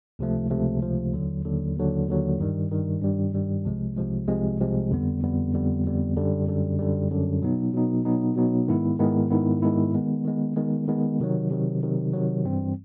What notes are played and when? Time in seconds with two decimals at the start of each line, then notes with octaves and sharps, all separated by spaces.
0.19 C#2 C3 F3 A3
0.50 C#2 C3 F3 A3
0.82 C#2 C3 F3 A3
1.13 D#2 D3 F#3
1.45 D#2 D3 F#3
1.76 D#2 D3 F#3
2.08 D#2 D3 F#3
2.39 G2 D#3 G3
2.71 G2 D#3 G3
3.02 G2 D#3 G3
3.33 G2 D#3 G3
3.64 C2 C3 F3 G#3
3.97 C2 C3 F3 G#3
4.28 C2 C3 F3 G#3
4.60 C2 C3 F3 G#3
4.91 F2 D3 G3 B3
5.22 F2 D3 G3 B3
5.54 F2 D3 G3 B3
5.84 F2 D3 G3 B3
6.16 F#2 D3 G3
6.47 F#2 D3 G3
6.79 F#2 D3 G3
7.10 F#2 D3 G3
7.42 B2 F#3 B3 D#4
7.73 B2 F#3 B3 D#4
8.05 B2 F#3 B3 D#4
8.36 B2 F#3 B3 D#4
8.68 G#2 D#3 G#3 B3 E4
8.99 G#2 D#3 G#3 B3 E4
9.30 G#2 D#3 G#3 B3 E4
9.62 G#2 D#3 G#3 B3 E4
9.94 D#3 G#3 B3
10.25 D#3 G#3 B3
10.56 D#3 G#3 B3
10.88 D#3 G#3 B3
11.20 C3 D#3 F#3
11.50 C3 D#3 F#3
11.83 C3 D#3 F#3
12.13 C3 D#3 F#3
12.45 G2 E3 G3 C4